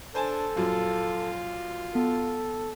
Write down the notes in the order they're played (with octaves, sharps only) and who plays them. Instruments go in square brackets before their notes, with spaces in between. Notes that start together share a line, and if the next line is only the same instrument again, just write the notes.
[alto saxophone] D4 [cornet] A4 [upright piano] C5 G#5 A5
[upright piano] F#2 A#2 F3 [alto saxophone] F4
[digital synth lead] B3 [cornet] A4